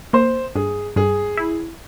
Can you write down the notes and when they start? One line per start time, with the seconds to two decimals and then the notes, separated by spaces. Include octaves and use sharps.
0.13 A#3 C5
0.55 G2 G#4
0.96 G2 G#4
1.37 E4